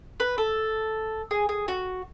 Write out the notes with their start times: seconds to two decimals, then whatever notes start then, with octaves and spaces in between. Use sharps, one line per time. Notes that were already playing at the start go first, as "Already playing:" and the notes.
0.20 B4
0.38 A4
1.31 G#4
1.49 G#4
1.68 F#4